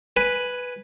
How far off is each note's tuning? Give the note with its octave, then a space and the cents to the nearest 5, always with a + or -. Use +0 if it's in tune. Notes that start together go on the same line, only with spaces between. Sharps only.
B4 +0 G#5 +0